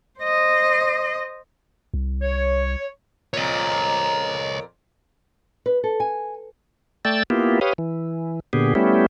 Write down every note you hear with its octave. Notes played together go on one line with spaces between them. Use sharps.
C5 D#5
C2
C#5
F2 A#2 C#5 D#5
B4
A4
G#5
A3 D5 G5 E6 A6
A#3 B3 E4 F4 G4
G4 B4 C#5 F5 D#6
E3
A#2 D3 B3 G4 G#4
G3 A3 B3 C#4 E4 G4